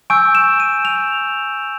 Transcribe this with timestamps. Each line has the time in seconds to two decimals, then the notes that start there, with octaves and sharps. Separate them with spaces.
0.10 G#5 C#6 E6 G6 D7
0.35 E7
0.60 D#7
0.85 F7